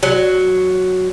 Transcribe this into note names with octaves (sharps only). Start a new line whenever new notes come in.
F#3